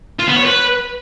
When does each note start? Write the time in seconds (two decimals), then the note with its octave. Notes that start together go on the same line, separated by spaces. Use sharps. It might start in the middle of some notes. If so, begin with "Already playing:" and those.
0.19 F4
0.28 B3
0.36 C#5
0.45 B4